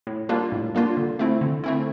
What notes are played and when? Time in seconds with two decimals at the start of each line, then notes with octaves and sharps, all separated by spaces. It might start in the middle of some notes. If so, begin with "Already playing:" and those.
0.07 A2
0.29 G3 A#3 D4 F4
0.52 A2
0.75 G3 A#3 D4 F4
0.97 D3
1.19 A3 C4 E4
1.41 D3
1.64 A3 C4 E4